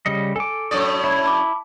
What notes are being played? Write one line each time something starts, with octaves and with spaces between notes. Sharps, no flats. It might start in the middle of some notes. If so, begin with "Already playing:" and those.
C#3 G3 D#5 C#7
A4 G#5 D6
F#2 A2 C#5 D5 D#6
E4 C#5 G#6
A5 B5 D6